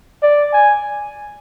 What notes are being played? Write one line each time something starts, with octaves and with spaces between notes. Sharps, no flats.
D5
G#5